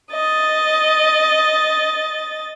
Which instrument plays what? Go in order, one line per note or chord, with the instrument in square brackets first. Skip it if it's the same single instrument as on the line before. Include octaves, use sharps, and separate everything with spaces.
[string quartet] D#5 A6